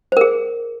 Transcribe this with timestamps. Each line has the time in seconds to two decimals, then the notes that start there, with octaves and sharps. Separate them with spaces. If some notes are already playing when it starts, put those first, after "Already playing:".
0.12 C5
0.17 A#4
0.21 G#4